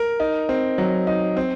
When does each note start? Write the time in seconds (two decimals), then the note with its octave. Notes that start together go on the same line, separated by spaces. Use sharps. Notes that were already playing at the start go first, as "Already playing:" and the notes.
Already playing: A#4
0.20 D#4
0.49 C4
0.78 F#3
1.07 D#4
1.37 C4